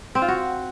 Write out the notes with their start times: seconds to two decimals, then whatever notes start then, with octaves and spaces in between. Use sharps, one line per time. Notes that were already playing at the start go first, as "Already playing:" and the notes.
0.15 C4
0.22 F4
0.28 F#4